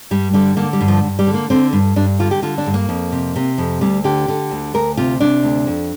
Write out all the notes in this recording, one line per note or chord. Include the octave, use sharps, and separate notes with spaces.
G2 G3
D3 G3
D3 A#3
G3
G2
F3
G2
G3
D3
A#3
D3 C4
G2
G2 D4
D3 F4
G4
D3 F4
D4
G2
A#3
F2
C3
C3
F2
D2 G3
D3 G4
D3
D2
D2 A#4
C3 F4
C3 D4
D2
F2